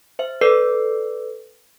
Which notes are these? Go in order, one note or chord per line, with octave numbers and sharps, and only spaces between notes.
C5 E5
A4 B4 D5 E6 C7